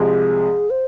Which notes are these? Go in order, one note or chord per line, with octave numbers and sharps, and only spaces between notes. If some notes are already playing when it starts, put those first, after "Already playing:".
Already playing: C2 C3 F3 G#3 G#4
C5